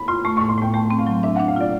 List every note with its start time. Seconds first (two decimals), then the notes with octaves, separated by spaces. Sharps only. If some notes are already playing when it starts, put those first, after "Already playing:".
Already playing: B5
0.08 F4 C6
0.25 A3 C#6
0.37 A2 C#6
0.49 C6
0.58 A2 G5
0.74 A3 G5
0.90 C4
0.99 F5
1.07 F#3
1.23 D4 E5
1.36 D4 F#5
1.48 F5
1.56 F4 D5